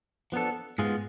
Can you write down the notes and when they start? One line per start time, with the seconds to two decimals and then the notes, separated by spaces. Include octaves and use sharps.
0.32 F3 B3 D4 A4
0.78 G#2 G#3 B3 F4 G#4